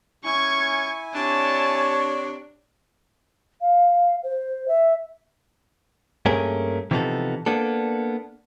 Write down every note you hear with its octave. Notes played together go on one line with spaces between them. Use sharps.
C#4 E4 G#5 C#6 G#6
C3 D4 C#5 A5
F5
C5
E5
G2 A3 A#3 C#4 G#4 A#4
C3 E3 F3 B3 D#4 A4
A#3 B3 D4 A4